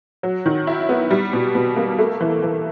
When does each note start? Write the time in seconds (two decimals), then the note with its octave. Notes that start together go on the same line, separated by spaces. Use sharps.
0.23 F#3
0.46 D#3
0.67 E4
0.89 B3
1.11 G3
1.33 B2
1.55 B2
1.77 A#3
1.99 A3
2.20 E3
2.43 E3